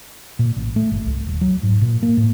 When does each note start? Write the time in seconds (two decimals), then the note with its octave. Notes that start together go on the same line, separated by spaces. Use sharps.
0.39 A#2
0.57 A1
0.76 A3
0.92 G1
1.07 C2
1.27 D#1
1.41 F#3
1.63 G#2
1.81 A#2
2.03 A#3
2.17 A2